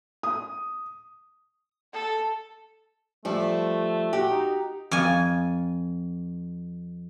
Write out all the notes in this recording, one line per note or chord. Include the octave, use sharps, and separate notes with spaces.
D#6
A4
F3 G3 A3
F#4 G4
D#4
F2 G#5